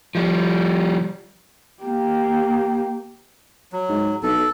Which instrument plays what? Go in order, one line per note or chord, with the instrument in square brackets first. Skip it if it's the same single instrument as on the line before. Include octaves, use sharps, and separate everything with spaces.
[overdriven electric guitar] F3 G3
[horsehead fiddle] A#3 G4
[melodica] F#3
[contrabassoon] G#2
[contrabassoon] B1 [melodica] A4